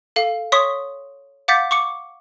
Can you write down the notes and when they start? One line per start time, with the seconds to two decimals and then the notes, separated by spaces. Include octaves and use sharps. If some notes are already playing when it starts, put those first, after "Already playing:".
0.16 A4 F5
0.52 C#5 C6 C#6 D#6 B6
1.48 F5 F#5 D6 G6 A6 B6
1.71 C#6 D6 C#7